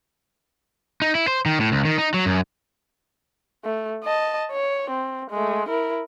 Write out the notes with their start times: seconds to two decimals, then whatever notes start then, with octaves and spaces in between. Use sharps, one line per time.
1.02 D#4
1.15 E4
1.28 C5
1.46 D#3
1.60 A2
1.72 C#2
1.85 D#3
1.98 D#4
2.14 F#3
2.26 F#2
3.65 A3
4.04 D#5 A5
4.52 C#5
4.90 C4
5.30 G#3 A3
5.69 E4 A#4